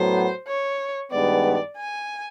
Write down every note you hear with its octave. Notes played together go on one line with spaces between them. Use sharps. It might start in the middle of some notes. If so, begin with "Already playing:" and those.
Already playing: A2 F#3 B3 C5
C#5
G2 D#3 G#3 B3 D5
G#5